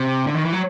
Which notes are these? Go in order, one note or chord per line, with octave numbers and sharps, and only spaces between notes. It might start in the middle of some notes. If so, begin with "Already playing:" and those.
Already playing: C3
D3
D#3
E3
F#3